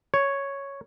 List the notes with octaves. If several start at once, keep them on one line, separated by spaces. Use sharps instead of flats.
C#5